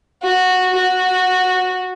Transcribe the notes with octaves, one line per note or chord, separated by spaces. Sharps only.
F#4
F#4